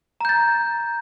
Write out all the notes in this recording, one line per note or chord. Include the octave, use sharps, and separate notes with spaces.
A#5 G6 A6